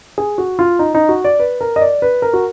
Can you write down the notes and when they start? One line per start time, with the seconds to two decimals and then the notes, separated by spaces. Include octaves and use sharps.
0.18 G#4
0.38 F#4
0.59 F4
0.79 D#4
0.95 D#4
1.09 F#4
1.24 D5
1.40 B4
1.61 A#4
1.76 D#5
1.81 D5
2.02 B4
2.22 A#4
2.33 F#4